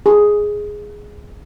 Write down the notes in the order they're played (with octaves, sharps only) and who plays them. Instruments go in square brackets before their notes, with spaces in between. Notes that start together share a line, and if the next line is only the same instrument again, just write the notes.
[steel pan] G#4